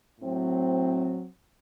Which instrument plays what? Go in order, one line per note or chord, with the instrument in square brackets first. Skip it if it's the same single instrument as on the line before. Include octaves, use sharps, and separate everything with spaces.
[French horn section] A2 F#3 C4